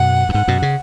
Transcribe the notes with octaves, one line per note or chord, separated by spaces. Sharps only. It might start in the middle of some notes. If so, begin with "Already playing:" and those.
Already playing: F#2 B2 F#5
F#2
G#2 F#5
F#2 B2
C#3